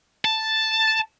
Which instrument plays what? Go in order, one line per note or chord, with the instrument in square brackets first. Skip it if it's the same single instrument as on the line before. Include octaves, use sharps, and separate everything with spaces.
[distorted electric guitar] A5